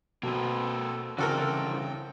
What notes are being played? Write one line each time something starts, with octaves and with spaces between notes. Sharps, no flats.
B2 A#3 C4 A4 B4
C2 C#3 E3 C4 F#4 A4 A#4 G5